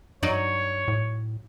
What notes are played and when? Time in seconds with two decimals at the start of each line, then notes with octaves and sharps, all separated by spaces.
0.23 G2 F#3 D#4 C#5 D5
0.88 A2